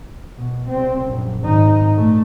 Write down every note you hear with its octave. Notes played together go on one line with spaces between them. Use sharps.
B2
C2 C4
A#1 F#2
G#1 D#4
A#2 A3